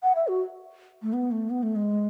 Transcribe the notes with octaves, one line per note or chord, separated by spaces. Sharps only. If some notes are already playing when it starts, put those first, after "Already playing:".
F#5
E5
F#4
A3
B3
A3
B3
A3
G#3